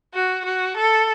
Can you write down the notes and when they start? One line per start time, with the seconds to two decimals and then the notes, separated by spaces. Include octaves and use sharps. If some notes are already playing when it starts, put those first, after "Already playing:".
0.14 F#4
0.46 F#4
0.77 A4